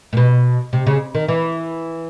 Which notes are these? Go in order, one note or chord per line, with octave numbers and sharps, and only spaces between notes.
A#2
B2
C3
C#3
D#3
E3